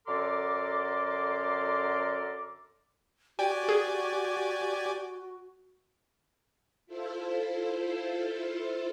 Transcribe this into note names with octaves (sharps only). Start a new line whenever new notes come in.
F#2 D3 A4 A#4 C6 D6
F#4 G4 D5 G5 G#5
G#4
E4 F4 A4 C5